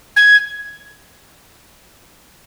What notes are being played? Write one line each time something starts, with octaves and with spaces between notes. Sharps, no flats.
G#6